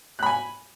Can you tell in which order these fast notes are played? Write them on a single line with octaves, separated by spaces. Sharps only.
F#6 B5 G#5